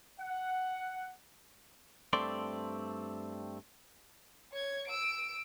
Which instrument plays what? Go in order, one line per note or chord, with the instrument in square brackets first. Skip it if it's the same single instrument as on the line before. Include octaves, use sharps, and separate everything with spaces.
[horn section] F#5
[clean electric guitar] G2 A3 C4 D5 C6
[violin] C#5 G#6
E6 D7